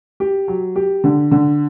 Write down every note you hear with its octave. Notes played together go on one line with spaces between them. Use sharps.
G4
F#3
G4
D3
D3